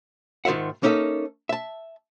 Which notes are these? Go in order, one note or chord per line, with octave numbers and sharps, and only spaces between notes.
G#2 D#3 F4 E5 F#5
A#3 C#4 D#4 A4 E5
E5 A5